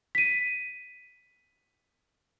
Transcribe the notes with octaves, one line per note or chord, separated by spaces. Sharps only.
B6 D#7